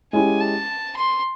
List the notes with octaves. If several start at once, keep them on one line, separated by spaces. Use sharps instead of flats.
G#3 C#4 E4 G4 G#5
A5
C6